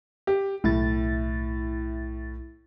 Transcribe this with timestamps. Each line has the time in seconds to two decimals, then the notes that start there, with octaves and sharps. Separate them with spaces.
0.27 G4
0.64 B1 A2 E4 A6